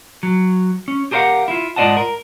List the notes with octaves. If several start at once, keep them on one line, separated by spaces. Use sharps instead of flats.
F#3
C#4
G4 G#4 A#4 C5 F5 F#5
E4 F4
G#2 F4 D5 D#5 F#5 A5
A#4